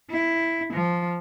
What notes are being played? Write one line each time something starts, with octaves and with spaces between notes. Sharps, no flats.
E4
F3